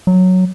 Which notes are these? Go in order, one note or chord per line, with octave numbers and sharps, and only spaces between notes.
F#3